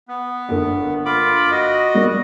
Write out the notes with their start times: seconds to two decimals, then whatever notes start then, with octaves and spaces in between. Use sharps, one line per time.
0.08 B3
0.49 G1 D3 A#3
1.06 F4 B5 D6
1.51 F#4 D#5
1.94 G3 A#3